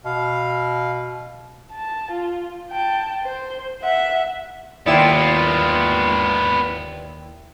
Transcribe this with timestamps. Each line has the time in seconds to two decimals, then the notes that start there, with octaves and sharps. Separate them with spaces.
0.05 B2 F5
1.71 A5
2.11 F4
2.70 G5 A5
3.23 C5
3.82 E5 F#5
4.86 D#2 B3 E4 F4 D5 G5 C6 E7